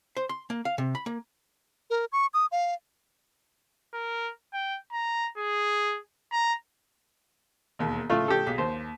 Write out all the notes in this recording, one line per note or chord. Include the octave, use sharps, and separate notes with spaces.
C5
C6
A#3
F5
C3
B5
A#3
A#4
C#6
D#6
F5
A#4
G5
A#5
G#4
A#5
E1 D#2
A2 C#3 A3 F4
G4 A4
B1 G#4 B6
D#2 C5